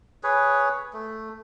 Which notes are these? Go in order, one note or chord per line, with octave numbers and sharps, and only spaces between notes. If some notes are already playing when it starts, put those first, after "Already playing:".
G#4 B4 C#5
A3